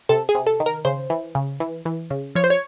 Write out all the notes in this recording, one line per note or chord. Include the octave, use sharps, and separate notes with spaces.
C3 A4
G#4
C3
A4
D#3
A#4
C#3 C5
E3
C#3
E3
E3
C#3
F3 C#5
C5
C#5